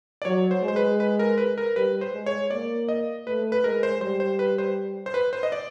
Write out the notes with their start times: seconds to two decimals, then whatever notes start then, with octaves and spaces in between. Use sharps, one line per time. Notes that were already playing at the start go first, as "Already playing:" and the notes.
0.22 D5
0.25 F#3 C#5
0.51 C5
0.63 G#3
0.68 C5
0.76 B4
1.00 B4
1.19 A#4
1.38 B4
1.58 A#4
1.76 G3 B4
2.01 C5
2.13 G#3
2.26 C#5
2.51 A#3 D5
2.89 D#5
3.27 A3 B4
3.52 B4
3.64 G#3 A#4
3.83 C5
4.01 G3 C5
4.20 C5
4.39 B4
4.58 C5
5.06 C5
5.14 B4
5.33 C5
5.43 D#5
5.52 D5